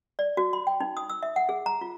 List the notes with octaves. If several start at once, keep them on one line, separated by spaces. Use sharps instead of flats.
D5
F#4
B5
G5
D#4
D#6
E6
E5
F#5
G#4
A#5
F4